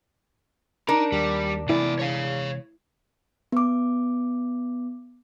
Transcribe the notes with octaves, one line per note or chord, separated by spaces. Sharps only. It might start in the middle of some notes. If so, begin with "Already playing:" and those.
D4 D#4 A#4
D#2 G3
C3 E3 G#3 B3 E4 D5
C#5 F5
B3 D6